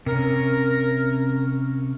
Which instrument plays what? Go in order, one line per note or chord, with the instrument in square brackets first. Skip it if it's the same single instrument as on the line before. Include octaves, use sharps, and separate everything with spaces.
[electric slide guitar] C3 C#4 [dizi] A#4